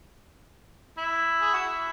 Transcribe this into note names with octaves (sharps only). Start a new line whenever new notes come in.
E4
G#4
F#4
E4